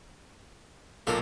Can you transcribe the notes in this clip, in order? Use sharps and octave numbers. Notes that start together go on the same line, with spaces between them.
B1 A#2 A#3 F4 A4